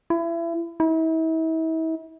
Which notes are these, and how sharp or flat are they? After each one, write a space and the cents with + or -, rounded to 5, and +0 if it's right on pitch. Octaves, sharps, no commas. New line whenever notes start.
E4 +30
E4 -40